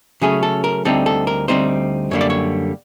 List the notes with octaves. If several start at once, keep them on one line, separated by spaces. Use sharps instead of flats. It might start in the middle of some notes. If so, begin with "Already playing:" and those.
C#3 F#3 A3 C#4 G#4
A4
A#4
D2 D3 G3 C4 D#4 A4
A4
A#4
D2 D3 G3 C4 D#4 C5
F#2 D3 G3 A#3 C#5
D5
C#5